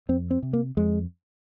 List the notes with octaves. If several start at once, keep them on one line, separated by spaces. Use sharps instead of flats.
F2 C4
C4
C3
A#3
F2 G#3